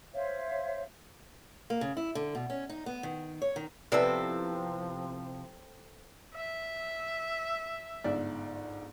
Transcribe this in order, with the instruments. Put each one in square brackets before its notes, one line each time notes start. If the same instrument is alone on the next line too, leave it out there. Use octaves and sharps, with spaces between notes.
[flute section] C5 C#5 E5 F5
[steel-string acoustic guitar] A#3
C#3
E4
D3
B2
C#4
D#4
B3
D#3
C#5
D#3
[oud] C3 B3 E4 [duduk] F3 [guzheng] C4 A4 [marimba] B4 D5
[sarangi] E5
[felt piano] G1 G#2 D5